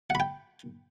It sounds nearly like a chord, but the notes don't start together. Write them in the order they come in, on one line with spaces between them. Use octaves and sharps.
F#5 B5 G5